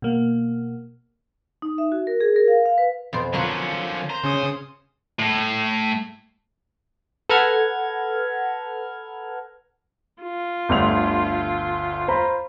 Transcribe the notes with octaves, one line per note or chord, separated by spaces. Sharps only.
B2 A#3
D#4
E5
F#4
A#4
G#4
A#4
F5
F5
B4
F2 B2 C5
D3 F3 C#4 F4 F#4 A#4
C5 A#5
C#3 C#4 D#6
A2
A4 B4 F#5 A#5 F6 G#6
F4
G1 D2 F7
C5 A#5 B5